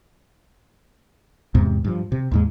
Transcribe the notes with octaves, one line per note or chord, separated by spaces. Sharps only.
E2 G#2 C3
G2 F3
C3
D#2 G#2 G#3